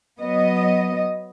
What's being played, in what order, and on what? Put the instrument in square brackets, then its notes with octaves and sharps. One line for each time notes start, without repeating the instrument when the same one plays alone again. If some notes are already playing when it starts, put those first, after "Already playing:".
[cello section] F#3 B3 D#5